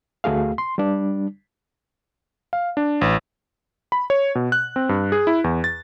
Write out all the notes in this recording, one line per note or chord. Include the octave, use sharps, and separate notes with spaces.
D2 A3 F#4 G#4 F5
C6
G3 D4
F5
D4
A1
B5
C#5
B2
F#6
C4
G2
G#4
E4
E2
A6